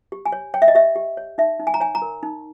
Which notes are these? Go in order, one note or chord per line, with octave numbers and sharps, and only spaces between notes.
G4
G#5
C#5
C#5 G5
E5
D#5
G4 E5
G4
C#5
D#4 E5
D#4
G#5
A#5
C#5 G#5
A#5
A#4
D#4